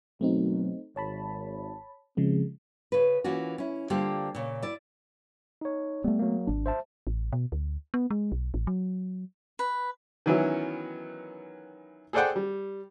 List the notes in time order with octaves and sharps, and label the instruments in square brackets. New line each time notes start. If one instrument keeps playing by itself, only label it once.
[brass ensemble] G#1 B2 F#3 [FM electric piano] A3 C4 D#4
[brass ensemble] G#1 [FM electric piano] C#5 A5 B5
[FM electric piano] C#3 F3 G#3 [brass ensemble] C4 G#4
[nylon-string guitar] C#3 B4
E3 A#3 C#4 F4 F#4
C#4 E4
D3 G3 A#3 F4 G4 C5
A#2 C#3
E4 D5
[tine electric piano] D#4 C#5
[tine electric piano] G3 [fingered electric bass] A3 B3
[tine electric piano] F#3 A#3
[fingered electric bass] G#1 D4
[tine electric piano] C5 E5 A5
[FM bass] A1
B2
D2
B3
G#3
B1
A1
F#3
[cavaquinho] B4
[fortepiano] D#3 E3 F#3 B3 C#4 E4
G#4 A4 C5 D5 F#5 G5
G3